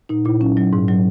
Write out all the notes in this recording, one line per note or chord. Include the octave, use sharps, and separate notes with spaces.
A#2 D#4
A#2 E4
F#3 C#4
F#3
G#2
F#3